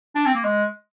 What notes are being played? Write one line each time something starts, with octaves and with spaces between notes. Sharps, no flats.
D4
C4
A#3
G#3